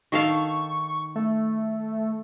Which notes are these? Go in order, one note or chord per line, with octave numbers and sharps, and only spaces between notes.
D#3 A4 F5 C#6
A3